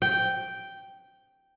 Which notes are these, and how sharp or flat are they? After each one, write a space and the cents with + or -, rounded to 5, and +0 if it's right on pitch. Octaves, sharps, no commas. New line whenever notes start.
G5 -5